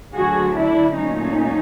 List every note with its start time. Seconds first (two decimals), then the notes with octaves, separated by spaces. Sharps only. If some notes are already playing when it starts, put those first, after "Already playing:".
0.14 D2 D3 F#3 F#4 G#4
0.55 D4 E4
0.96 A#2 F#3 A3 C#4 D#4